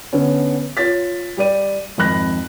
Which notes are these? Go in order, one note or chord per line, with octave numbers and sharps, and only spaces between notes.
D3 B3 C#4
F4 C#5 A6 B6
G3 G4 D5 D#7
G#1 F2 B5 F#6 A#6